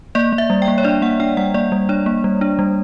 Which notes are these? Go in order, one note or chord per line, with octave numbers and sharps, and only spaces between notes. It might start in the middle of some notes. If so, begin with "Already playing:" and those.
A#3 D5
A#3
E5
G3
G5
A#3
C#5
D4 D5
A#3 F#5
D4 G5
G3 F#5
A#3 D5
G3
D4 C#5
A#3
G3
D4
G3